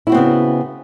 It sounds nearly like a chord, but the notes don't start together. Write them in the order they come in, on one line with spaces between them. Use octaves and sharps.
E4 F#4 C4 B3 C#3